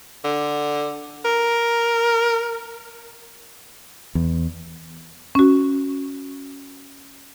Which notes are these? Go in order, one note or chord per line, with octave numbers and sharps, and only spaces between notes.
D3
A#4
E2
C#4 F#4